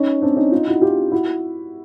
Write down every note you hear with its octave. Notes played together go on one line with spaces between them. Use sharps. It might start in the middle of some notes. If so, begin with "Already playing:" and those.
Already playing: C#4 D#4
C4 D4
C#4 D#4
D#4 F4
E4 F#4
F4 G4
E4 F#4